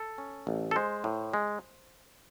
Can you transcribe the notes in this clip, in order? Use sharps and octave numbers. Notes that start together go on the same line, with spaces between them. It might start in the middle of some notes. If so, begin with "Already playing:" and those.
Already playing: A4
C#4
A1
A4
G#3 C5
A2
G#3